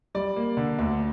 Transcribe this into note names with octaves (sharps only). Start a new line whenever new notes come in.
G3 D5
A#3
D3
D2